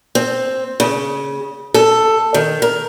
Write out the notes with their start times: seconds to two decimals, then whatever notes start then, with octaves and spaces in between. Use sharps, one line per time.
0.15 C4
0.80 C#3
1.74 A4
2.34 D#3
2.62 A#4